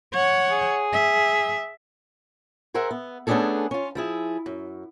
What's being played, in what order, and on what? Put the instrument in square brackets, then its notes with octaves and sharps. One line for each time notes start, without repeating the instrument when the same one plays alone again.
[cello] C#5 F#5
[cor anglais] G#4
[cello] E5
[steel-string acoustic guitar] G#4 A#4 C5 E5 F#5
B3
A3 B3 C#4 D4 G#4 A4
C#4 F4
F3 E4 G#4
F#2